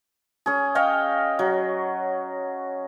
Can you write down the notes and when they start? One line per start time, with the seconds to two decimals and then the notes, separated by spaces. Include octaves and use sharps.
0.46 C#4 G#4
0.75 C#5 D#5 F5 G5
1.39 F#3